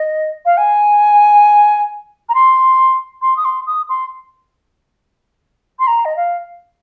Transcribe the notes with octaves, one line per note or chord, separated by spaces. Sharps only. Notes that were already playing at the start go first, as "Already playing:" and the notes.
Already playing: D#5
F5
G#5
A#5
C6
C6
D#6
C6
D#6
C6
C6
A#5
D#5
F5